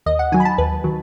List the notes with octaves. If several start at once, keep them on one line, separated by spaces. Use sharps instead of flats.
D#2 D#5
F#5
D#3 F#3 G#5
B5
A5
D#2 B4
D#3 F#3